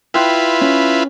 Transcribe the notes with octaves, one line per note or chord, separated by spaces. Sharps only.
E4 F4 B4 G5 C6 F#6
C#4